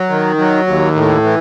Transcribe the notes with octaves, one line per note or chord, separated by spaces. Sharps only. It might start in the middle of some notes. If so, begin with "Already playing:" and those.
Already playing: F#3
D#3
F#3
D#2
A2
E3